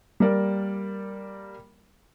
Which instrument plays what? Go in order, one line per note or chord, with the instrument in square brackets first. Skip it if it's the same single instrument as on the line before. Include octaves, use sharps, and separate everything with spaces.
[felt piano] G3 A#3 A#4 D5